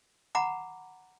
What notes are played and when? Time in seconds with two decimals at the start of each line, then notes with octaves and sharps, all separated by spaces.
0.35 F#5 A#5 B5 D6